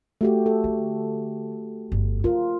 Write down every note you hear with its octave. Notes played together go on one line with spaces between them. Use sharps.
A3 F#4 G4
A4
D3
G1
C#3 F4 A#4